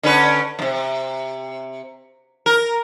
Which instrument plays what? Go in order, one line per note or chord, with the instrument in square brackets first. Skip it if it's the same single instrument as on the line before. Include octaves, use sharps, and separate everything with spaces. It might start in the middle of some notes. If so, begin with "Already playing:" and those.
[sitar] D3 C#4 B4
F#2 C3
A#4